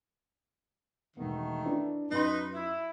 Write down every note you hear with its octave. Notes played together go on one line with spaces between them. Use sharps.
E1 D#3 A3 B3
D4 E4 B4
F#2 D#4 B4 C6
E4